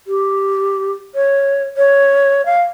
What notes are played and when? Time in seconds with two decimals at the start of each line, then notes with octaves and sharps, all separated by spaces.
0.07 G4
1.15 C#5
1.77 C#5
2.46 F5